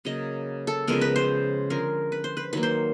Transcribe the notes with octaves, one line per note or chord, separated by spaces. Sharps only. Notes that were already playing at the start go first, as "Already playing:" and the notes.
C#3 F#3 A#3 D#5
A4
C#3 F3 G#3 B3 A#4
B4
C5
D3 F3 G#3 C#4 A#4
B4
C5
B4
D#3 F#3 A#3 B4
C5